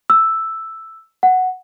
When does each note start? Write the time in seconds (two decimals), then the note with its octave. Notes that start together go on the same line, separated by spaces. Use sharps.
0.10 E6
1.23 F#5